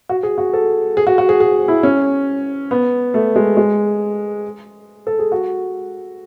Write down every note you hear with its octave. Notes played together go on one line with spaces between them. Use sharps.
F#4
G#4
F#4
A4
G#4
F#4
F#4
G#4
G#4
E4
C#4
B3
A3
G#3
G#3
A4
G#4
F#4